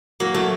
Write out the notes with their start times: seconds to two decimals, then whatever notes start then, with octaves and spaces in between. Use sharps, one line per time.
0.20 F#3 A#3
0.34 F#3 A3